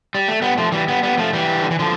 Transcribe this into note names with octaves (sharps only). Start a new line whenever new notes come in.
G3
A3
G3 B3
F3 A3
E3 G3
G3 B3
G3 B3
F3 A3
E3 G3
D3
E3
D3 F3